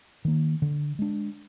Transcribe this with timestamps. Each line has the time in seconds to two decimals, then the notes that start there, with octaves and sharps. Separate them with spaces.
0.25 D#3 A#3
0.62 D3
0.99 G#3 D4